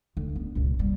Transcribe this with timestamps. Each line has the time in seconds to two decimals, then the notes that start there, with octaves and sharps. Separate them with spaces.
0.17 D2
0.36 B3
0.55 C#2 A#2
0.79 G3 A#3